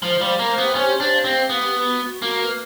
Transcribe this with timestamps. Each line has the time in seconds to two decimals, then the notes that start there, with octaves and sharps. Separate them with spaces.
0.02 F3 C5
0.21 G3 F5
0.39 A#3 C5
0.57 B3 G4
0.75 C#4 C5
0.94 G4
1.00 D4
1.12 F5
1.24 C4
1.30 G4
1.49 B3 B4
1.67 B4
1.85 F#4
2.04 F#4
2.22 A#3 F#4
2.40 B4